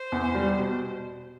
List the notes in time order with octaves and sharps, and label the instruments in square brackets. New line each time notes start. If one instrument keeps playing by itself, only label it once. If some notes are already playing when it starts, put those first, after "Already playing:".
Already playing: [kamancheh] C5
[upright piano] E2
G3
B2